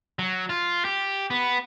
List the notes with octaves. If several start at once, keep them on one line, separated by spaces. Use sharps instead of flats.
F#3
F4
G4
B3